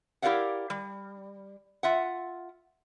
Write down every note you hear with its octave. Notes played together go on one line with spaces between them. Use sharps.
E4 G4 A#4 D5 F5 F#5
G3
F4 E5 F#5